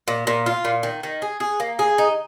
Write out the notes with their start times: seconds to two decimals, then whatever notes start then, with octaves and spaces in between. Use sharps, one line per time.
0.08 A#2
0.27 A#2
0.46 F4
0.65 A#2
0.83 D#3
1.03 D#3
1.22 G#4
1.40 G#4
1.60 A#3
1.79 G#4
1.98 D#4